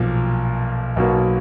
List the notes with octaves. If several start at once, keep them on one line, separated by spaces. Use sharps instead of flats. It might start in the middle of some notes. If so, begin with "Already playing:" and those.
Already playing: B1 A#2 F3 A#3
B1 B2 F#3 A#3